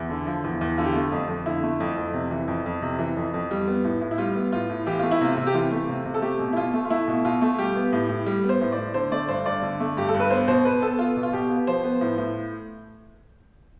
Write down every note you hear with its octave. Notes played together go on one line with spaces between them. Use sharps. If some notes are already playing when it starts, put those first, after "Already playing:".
Already playing: E2 E4
D3
F3
E2
E2
D3 F4
G4
A3 F4
F2
F2
D3 E4
A3
F2
F2
C3
E3
F2
F2
C3
E3
F2
F2
G3
B3
A2
A2
E4
G3 F4
B3
A2 F4
A2
E3 G4
A3 F4
E4
C3 F4
C3
G4
E3 F4
A3
C3
C3
A4
A3 G4
B2
E4
B2 F4
A3
F4
A3 E4
B2
B2 F4
A3
G3 G4
B3
A2
A2
G3
B3
C5
A2
D5
A2
D3 C5
A3 D5
G2 C5
G2 D5
D3
A3
G2 G4
A4
G2
B4
B3 C5
B2 C5
B2 B4
B3 A4
B3 F4
B2
F4
B2 G4
B3
F3 C5
B3
A2
A2